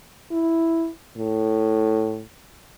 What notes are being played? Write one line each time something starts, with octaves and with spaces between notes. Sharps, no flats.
E4
A2